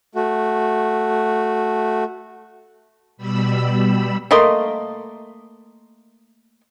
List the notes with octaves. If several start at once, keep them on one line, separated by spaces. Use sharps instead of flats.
A3 F#4
B2 G3 B5 E6
A3 A#3 D#5 C6